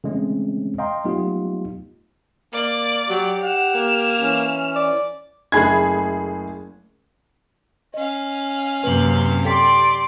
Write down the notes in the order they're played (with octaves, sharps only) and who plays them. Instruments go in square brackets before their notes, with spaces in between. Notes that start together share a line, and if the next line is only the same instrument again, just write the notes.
[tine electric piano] C#3 E3 G#3 A3 C4 C#4
D#5 F5 G5 A#5 C6
F#3 A3 B3 D#4 F4 G4
[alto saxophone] A#3 [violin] D5
[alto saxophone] F#3 [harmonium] G4
[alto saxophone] F#5 [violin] F6 E7
[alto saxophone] A#3
[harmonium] E3 C#4
[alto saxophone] D5
[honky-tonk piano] F#1 A3 G#4 B5 G#6
[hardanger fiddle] C#4 F5 [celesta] D#5
[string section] F#2 C3 [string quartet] A#3 G6 [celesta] B4 F#7
[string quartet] G4 C6 D6 [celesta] A4 G5 B6 [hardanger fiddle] D5